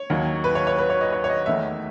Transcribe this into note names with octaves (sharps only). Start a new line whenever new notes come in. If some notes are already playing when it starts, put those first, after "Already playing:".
Already playing: C#5
D#2 D#3 F#3
B4
C#5
C#5
B4
C#5
D#5
C#5
C#5
D#5
E2 D#3 A3 E5